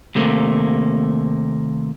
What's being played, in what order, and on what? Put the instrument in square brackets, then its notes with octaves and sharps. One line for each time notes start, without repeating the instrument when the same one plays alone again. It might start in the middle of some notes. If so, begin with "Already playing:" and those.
[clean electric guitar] D#2 C3 A3 A#3